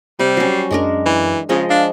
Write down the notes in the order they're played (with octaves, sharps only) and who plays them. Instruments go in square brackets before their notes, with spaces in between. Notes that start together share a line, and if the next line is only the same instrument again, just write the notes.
[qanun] C3 [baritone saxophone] G3
[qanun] F#3 C#4 [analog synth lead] C7
[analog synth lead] F#2 [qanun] G#3 D4 A#4
[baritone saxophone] E3
[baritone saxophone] C#3 [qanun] F3 G#3 D#5
[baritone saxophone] D4 [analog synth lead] F5